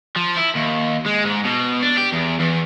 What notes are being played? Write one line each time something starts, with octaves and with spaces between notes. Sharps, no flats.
F3
E4
D#2
G#3
G#2
B2
D4
G4
E2
E2